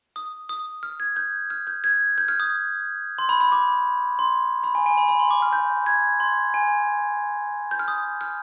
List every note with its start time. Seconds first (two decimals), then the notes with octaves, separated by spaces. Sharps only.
0.16 D#6
0.49 D#6
0.83 F6
1.00 G#6
1.16 G6
1.50 F6
1.67 G6
1.84 G#6
2.18 G6
2.28 F6
2.40 D#6
3.18 C6
3.29 B5
3.41 B5
3.52 D6
4.19 C6
4.64 B5
4.75 G#5
4.86 G#5
4.97 B5
5.08 B5
5.19 C6
5.31 D6
5.42 F6
5.53 G6
5.86 G#6
6.20 C6
6.54 G#5
7.71 G6
7.79 F6
7.88 D#6
8.21 F6